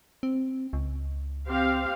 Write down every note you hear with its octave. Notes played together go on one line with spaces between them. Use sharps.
C4
C#2
C4 G4 F5